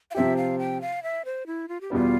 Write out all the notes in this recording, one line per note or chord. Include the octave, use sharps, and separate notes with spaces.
F5
C3 F3 C4 G4 E5
F5
G5
F5
E5
C5
E4
F4
G4
E2 B2 G3 B3 F4